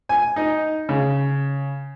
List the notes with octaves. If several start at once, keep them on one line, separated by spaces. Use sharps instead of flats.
G#5
D#4
C#3